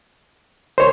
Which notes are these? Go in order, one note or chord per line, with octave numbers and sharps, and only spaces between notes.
A#4 C5 C#5